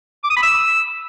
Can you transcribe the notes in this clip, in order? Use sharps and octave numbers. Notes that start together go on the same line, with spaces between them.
D6
D#6
B5
E6